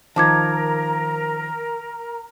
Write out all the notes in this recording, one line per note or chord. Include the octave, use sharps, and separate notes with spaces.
D#3 F3 A#4 A5 A#5 D6 G#6